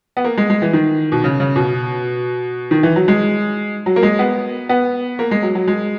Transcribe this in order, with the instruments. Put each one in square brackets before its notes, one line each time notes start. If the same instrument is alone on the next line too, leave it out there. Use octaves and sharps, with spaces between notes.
[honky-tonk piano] B3
A#3
G#3
G#3
E3
D#3
B2
C#3
C#3
B2
D#3
E3
F#3
G#3
F#3
A#3
G#3
B3
B3
A#3
G#3
F#3
F#3
G#3